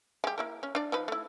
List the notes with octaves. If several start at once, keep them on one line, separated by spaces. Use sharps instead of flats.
G#3 G4
A#3 E4 A#4
C#4
D4 D5
F3 D#4 B4
A3 E4